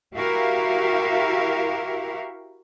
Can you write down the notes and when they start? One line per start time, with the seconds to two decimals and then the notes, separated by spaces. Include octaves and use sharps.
0.15 E4 F#4 G4 A#4 E5 F5